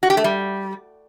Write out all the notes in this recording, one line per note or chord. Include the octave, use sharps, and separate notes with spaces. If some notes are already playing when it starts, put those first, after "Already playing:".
F#4
G4
A3
G3